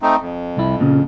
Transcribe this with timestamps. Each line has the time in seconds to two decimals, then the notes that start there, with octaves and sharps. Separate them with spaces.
0.02 A3 C4 D#4
0.22 F2
0.57 C2 E4
0.80 A#2 C#3